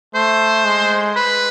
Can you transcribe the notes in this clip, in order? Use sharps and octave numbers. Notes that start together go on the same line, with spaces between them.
A3 C5
G#3
B4